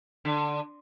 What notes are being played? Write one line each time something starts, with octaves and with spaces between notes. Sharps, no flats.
D3